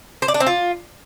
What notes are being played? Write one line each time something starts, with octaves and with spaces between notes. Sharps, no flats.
C5
D5
D4
C4
F4